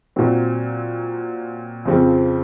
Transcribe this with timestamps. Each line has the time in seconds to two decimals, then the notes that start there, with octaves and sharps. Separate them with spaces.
0.16 A#2 F#3 C4
1.85 F2 C#3 F3 C4